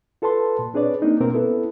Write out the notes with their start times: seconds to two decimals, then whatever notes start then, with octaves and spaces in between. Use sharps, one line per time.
0.22 F4 A4 B4 A5 C6
0.59 A#2
0.74 C4 D4 G#4 B4 C#5 D5
1.02 A#3 C4 D4 D#4
1.20 B2 A#3 C4 F4 A#4
1.34 B3 C#4 E4 A4 B4